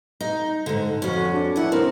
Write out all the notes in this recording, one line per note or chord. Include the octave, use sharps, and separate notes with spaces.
D#4
G#2 D3
F2 C#4 F#4
D4
D#2 E4 F#5
C4 A#4